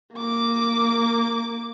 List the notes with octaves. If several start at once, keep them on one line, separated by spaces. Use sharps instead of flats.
A#3 D6